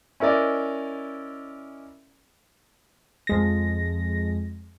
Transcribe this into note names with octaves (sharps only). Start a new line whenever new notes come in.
C#4 E4 A#4 D5 D#5
F2 G#3 A#6